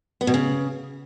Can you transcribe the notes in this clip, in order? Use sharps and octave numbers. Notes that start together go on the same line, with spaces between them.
B3
B2
C#3